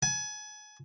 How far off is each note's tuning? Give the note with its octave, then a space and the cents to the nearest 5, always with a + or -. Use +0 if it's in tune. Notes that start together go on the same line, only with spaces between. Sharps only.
G#5 +30